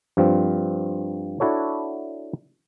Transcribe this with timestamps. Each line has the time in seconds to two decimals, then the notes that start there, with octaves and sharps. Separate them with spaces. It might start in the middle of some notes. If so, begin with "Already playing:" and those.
0.17 G2 F3 C4
1.40 D4 E4 F#4 A4 C#5